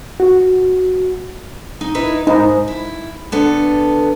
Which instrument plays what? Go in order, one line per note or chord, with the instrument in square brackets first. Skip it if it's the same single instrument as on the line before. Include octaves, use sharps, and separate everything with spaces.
[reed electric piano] F#4
[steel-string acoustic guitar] D#4
D#4 E4 B4
[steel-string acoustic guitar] G#2 [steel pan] D#4
[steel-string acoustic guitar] E4
D3 B3 A4